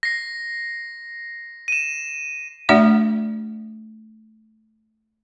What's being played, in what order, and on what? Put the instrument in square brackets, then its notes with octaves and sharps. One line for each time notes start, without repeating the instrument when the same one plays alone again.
[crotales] A#6 C7
D#7 E7
[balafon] A3 D4 F#4 D5 E5 F#5